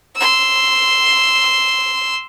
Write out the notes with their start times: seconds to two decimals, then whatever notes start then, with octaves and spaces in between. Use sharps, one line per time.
0.16 C6 E6